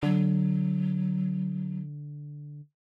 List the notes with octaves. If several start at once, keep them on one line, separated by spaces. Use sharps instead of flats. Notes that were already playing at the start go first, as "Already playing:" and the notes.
D3 F#3